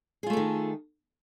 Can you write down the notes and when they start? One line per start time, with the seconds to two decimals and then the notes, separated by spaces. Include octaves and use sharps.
0.23 G#4
0.26 F4
0.30 A3
0.33 A4
0.37 D#3